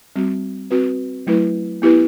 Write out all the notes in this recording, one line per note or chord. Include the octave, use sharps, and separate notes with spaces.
G3 C4 F#4
C4 F#4 B4
F#3 A3 E4 B4
B3 E4 G4 B4